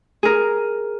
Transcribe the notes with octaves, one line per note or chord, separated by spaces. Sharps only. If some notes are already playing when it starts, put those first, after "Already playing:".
G#4 A#4